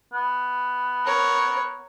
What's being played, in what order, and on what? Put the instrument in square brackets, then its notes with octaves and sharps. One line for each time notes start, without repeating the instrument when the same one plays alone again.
[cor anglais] B3
[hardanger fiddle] A#4 C#5